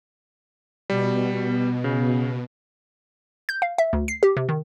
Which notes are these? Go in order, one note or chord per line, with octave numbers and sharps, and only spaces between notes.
B2 G3
C#3
G6
F5
E5
D2
C7
G4
C3
D#3